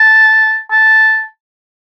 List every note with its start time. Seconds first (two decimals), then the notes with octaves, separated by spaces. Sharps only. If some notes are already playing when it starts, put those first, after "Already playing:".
Already playing: A5
0.71 A5